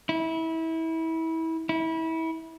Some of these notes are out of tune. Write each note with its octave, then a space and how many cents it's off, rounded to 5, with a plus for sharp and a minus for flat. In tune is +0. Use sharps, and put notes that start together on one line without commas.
E4 -25
E4 -25